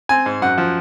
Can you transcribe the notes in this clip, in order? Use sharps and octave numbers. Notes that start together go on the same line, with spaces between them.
C4 G#5
G#2
F#2 F#5
F3